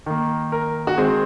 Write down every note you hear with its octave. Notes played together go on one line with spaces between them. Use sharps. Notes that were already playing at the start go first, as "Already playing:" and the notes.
D#3 A#3
A#4
F#4
D#3 G#3 C4 G#4